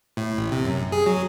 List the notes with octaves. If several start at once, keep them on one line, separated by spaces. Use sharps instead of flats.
A2
A1
C3
F#2
G#4
F#3